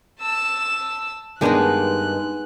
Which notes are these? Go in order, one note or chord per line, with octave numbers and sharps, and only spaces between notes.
A5 E6
G2 D#3 G#3 B3 D4 D#4 F#6